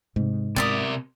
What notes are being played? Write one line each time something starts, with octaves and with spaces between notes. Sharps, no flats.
G#2 C3
C3 B3 A#4 D5 E5 D#6